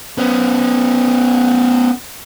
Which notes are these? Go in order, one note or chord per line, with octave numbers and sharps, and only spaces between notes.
B3 C#4